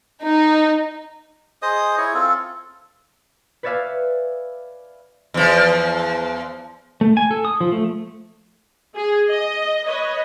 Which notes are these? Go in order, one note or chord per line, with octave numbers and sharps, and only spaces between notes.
D#4
G#4 C5 D#5 D#6
E4 G#4 C#5
C4 F4 A4
B4 C#5 D5 E5 F5 G#5
E2 F3
A3
G#5
A4
D#6
F3
A3
G#4
D#5
B4 C#5 D#5